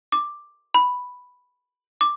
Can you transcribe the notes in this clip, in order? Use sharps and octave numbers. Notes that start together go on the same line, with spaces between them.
D6
B5
D6